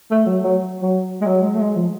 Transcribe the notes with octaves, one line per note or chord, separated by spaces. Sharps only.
A3
F#3
F#3
F#3
G#3
F#3
G#3
A3
G#3
F3